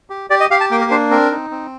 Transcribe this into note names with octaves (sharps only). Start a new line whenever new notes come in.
G4
G4 D5
D#5
G4 F5
A5
A#3 G5
A#4
D4 C5
C4 A#4
D#4
C4